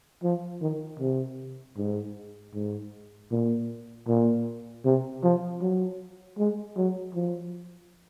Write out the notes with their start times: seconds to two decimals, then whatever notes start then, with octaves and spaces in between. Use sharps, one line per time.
0.23 F3
0.62 D#3
1.00 C3
1.77 G#2
2.54 G#2
3.31 A#2
4.08 A#2
4.85 C3
5.24 F3
5.61 F#3
6.38 G#3
6.77 F#3
7.15 F3